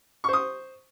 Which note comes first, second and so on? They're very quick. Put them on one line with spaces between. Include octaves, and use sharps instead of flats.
C#6 C5 D#6